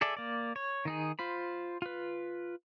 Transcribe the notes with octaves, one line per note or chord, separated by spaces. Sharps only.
G#4 A4 D5 E5
A#3 D5
C#5
D#3 D#4 G#4
F4 C5 B5
F4 B4